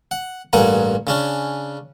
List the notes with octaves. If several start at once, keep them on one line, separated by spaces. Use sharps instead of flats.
F#5
A1 G2 A#3 F#5 G#5 A#5
C#3 C#4 D4